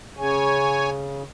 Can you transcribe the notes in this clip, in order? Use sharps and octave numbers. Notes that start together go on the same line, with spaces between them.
C#3 C#5 G#5